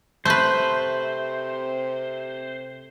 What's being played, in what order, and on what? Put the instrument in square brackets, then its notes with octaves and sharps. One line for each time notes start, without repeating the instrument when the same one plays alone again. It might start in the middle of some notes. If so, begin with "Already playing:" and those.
[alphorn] C3 [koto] A3 B4 [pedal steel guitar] C5